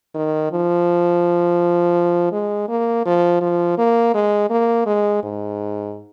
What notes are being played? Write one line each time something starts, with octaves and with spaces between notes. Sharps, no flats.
D#3
F3
G#3
A#3
F3
F3
A#3
G#3
A#3
G#3
G#2